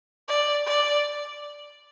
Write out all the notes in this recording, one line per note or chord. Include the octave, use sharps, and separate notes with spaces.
D5
D5